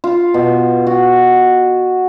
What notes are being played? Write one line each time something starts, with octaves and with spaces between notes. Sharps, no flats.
F4
B2
F#4